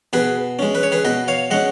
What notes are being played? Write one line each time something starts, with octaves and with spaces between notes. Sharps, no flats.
B2 G#4 B4
G#3 C#4
B4
C#5
G#4 B4
B2 B4 D#5
C#5 F5
G#3 C#4 D#5 F#5